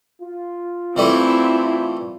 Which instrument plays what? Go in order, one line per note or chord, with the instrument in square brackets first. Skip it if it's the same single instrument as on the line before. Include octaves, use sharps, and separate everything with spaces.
[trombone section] F4
[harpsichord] E3 G3 A3 [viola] C4 E4